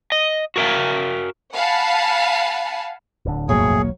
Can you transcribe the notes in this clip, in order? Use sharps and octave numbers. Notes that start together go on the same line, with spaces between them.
D#5
F#4 A#4 E5 F5
F5 F#5 G#5 A5 B5
D1 D3
D#1 B1 F2 A2 F#3 A#3 G#4 C#5